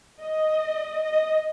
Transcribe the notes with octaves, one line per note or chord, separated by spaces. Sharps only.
D#5
D#5